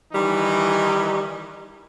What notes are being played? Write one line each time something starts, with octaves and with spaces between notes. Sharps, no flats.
D#3 E3 G3 D#4